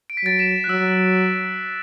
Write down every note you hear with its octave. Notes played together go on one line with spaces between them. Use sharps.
D7
B6
F#3 A6 D7
B6 E7
F#6
F#3 E6